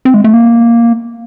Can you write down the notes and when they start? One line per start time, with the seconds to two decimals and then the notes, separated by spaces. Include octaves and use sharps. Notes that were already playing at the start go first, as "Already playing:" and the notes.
0.05 C4
0.14 G#3
0.24 A3
0.34 A#3